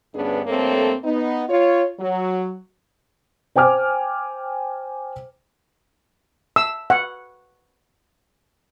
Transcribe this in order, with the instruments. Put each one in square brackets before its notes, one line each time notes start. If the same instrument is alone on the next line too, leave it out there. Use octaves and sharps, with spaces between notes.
[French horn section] D2 G2 B3 C#4 D4 G#4
G2 A3 A#3 C4 A4 C#5
B3 D#4
F4 C#5
F#3
[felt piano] C5 G5 G#5 D6 F6
[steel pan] E6
F#5